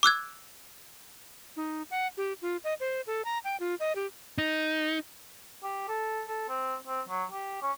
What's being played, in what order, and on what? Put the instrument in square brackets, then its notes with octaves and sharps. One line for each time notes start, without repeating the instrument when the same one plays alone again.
[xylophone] D6 E6 F#6 G#6
[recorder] D#4
F#5
G4
F4
D#5
C5
A4
A#5
G5
F4
D#5
G4
[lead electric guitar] D#4
[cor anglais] G4
A4
A4
C4
C4
F#3
G4
C#4